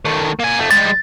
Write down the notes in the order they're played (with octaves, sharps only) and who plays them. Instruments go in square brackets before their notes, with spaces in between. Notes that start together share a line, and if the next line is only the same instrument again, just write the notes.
[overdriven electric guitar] D#3 A3
A#3 G#5
F2 A3
[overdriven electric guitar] G3 G#3 [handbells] A6